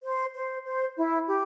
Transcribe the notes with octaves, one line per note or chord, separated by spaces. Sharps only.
C5
C5
C5
E4
G4